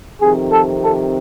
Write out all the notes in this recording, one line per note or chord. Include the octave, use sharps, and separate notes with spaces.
F2 C3 D#3 G#4
A4
A4